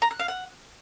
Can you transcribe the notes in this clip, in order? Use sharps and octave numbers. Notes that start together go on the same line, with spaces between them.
A#5
F#6
F5
F#5